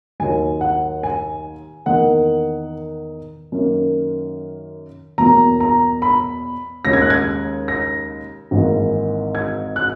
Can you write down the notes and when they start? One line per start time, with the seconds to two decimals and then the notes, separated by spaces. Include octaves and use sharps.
0.20 D#2 D#3 F#3 G#5
0.61 F#5
1.03 G#5
1.86 E2 D#3 A#3 F#5
3.52 F#2 D#3 A#3
5.18 E2 B2 F#3 A#3 A#5
5.60 A#5
6.02 B5
6.85 D#2 C#3 G#3 A#6
6.93 G#6
7.02 F#6
7.10 G#6
7.68 A#6
8.51 G#1 G#2 E3 A#3
9.35 G#6
9.76 F#6